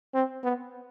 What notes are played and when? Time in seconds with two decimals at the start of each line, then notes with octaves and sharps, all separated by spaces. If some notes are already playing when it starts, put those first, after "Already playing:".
0.14 C4
0.44 B3